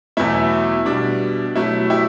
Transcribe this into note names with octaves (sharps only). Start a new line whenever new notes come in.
E2 B2 F#3 A3 E4
B2 G3 D4
B2 F#3 A3 E4
E4 G4